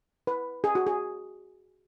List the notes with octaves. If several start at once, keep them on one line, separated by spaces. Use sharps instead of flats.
B4
G#4
F#4
G#4